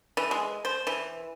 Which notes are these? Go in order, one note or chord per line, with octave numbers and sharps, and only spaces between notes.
E3
G#3
C5
E3